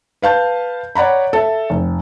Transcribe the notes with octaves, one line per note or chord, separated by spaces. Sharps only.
B4 F5 A5 G6
C#5 D5 F#5 A#5 B5
A4 E5
F1